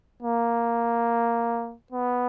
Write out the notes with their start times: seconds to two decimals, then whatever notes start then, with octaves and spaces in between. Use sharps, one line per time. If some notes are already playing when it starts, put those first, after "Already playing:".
0.23 A#3
1.92 B3